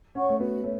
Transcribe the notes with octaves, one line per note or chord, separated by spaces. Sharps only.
C#4 C#5 F#5 C#6
A3
B3 F#4
A3 C#5